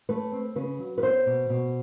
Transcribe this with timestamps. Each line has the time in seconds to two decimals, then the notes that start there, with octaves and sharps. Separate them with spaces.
0.09 A3 B4
0.32 C4
0.56 C#3 B4
0.79 F#3
0.98 B4
1.03 B3 C5
1.26 B2
1.49 B2